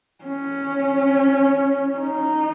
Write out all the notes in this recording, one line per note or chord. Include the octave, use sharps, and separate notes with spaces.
C#4
D#4